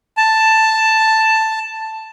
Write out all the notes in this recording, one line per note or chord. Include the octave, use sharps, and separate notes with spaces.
A5